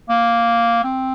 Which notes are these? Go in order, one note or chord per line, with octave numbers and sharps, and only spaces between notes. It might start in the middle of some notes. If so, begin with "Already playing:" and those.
A#3
C4